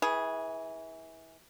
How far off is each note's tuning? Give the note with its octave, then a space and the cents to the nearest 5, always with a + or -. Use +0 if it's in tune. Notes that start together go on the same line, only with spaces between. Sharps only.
E3 -25 G#4 +0